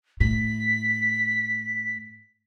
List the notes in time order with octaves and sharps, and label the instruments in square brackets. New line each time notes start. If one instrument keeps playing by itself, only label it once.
[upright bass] A2 [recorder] B6